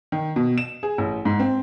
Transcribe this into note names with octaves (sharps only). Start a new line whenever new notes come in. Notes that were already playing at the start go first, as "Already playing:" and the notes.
D#3
B2
E7
G#4
A1
G#2
C4